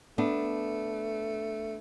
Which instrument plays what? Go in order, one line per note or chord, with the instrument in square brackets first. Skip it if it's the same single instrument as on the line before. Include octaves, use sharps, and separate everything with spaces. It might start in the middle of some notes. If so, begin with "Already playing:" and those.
[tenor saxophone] A3 [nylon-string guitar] B3 D4